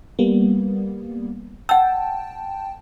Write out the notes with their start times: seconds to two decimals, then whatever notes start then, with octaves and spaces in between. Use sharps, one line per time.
0.19 G3 A#3 B3
1.69 F#5 G5 A5 E6